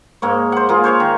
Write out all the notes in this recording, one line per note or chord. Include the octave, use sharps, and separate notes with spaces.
G#2 A#3 C#5
C5 F#5
A#3 F4 G#4
C5 C#5 F5 D6
D#3